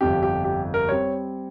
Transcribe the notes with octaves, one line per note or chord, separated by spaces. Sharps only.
G1 F2 C3 G4
G4
G4
A#4
G3 C4 C#5